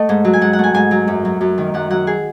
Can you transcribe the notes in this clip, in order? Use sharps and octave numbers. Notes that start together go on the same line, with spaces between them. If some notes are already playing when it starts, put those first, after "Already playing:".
Already playing: A3 D#5 F#5
G#2
F#3
G#5
G#2 F#5
F#5
A3 G#5
G#2 G#5
F#3
F#2
F#3
F#2
D#3
F#2 F#5
F#3 F#5
G#4